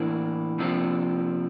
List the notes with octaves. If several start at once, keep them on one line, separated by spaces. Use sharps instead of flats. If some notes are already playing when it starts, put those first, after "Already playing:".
Already playing: A2 E3 A#3 D4
C3 F3 A#3 D4